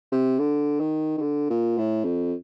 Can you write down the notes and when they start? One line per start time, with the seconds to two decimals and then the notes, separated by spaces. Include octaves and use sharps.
0.12 C3
0.39 D3
0.80 D#3
1.17 D#3
1.22 D3
1.50 A#2
1.78 A2
2.04 F2